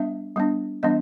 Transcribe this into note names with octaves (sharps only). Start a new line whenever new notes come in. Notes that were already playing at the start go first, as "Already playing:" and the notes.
Already playing: G3 B3 D4 E5
G3 B3 D4
E3 G3 B3 D4 D#5